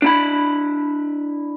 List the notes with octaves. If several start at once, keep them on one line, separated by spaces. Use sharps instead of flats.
D4 E4 B5